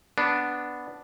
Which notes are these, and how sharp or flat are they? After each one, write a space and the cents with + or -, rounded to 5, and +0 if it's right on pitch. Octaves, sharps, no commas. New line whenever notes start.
B3 +0 D4 +0